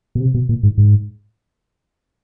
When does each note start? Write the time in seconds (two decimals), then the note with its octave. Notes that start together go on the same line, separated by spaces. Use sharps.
0.15 B2
0.20 C3
0.34 B2
0.49 A#2
0.63 G#2
0.78 G#2